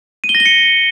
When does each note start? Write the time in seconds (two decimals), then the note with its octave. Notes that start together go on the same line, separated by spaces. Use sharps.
0.24 D#7
0.29 G7
0.35 A#6
0.40 G7
0.46 C#7